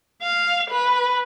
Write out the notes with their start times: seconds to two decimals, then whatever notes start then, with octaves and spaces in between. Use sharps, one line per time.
0.22 F5
0.70 B4